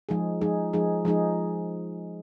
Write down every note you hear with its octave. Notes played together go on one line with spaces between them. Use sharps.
F3 G#3 D#4 G#4
F3 G#3 D#4 G#4
F3 G#3 D#4 G#4
F3 G#3 D#4 G#4